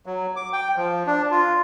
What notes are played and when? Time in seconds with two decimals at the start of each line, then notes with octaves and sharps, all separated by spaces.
0.06 F#3
0.36 D6
0.53 G5
0.76 F3
1.07 D4
1.31 F4